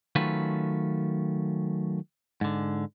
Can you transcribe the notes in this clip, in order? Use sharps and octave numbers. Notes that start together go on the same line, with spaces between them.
D#3 F#3 A3 C#4 F4 B4
G#2 D3